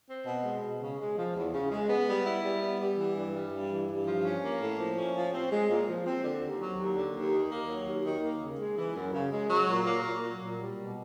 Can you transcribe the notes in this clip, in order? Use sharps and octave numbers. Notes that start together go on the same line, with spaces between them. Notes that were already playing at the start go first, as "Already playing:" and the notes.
C4
B2
G#3
B2
C#3
G#3
F3
E2
C#3
G#3
B3
G3
E4
G3
B3
G3
E3
G2
G3
G2
E3
G2
F3
C#4
A#3
A2
F3
C#4
F3
C4
G#3
A#2
F3
C4
D3
D#2
F#3
D#2
D3
D#2
D#3
A#3
F#3
D#2
D#3
A#3
C#3
G#3
E3
F#2
C#3
G#3
F#3
A#2
A#3
A#2
F#3
A#2
G3
B2